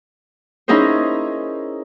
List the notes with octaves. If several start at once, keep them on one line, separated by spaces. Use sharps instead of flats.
C#4 D#4 E4 G#4 A#4 C5